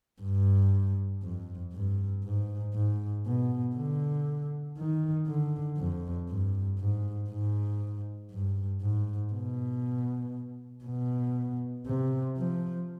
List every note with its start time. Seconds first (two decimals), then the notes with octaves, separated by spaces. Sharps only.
0.21 G2
1.23 F2
1.73 G2
2.25 G#2
2.74 G#2
3.26 B2
3.75 D3
4.78 D#3
5.27 D3
5.78 F2
6.29 G2
6.79 G#2
7.30 G#2
8.31 G2
8.82 G#2
9.33 B2
10.84 B2
11.86 C3
12.37 F3